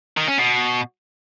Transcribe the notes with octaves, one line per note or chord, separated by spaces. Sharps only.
D#3
C#4
B2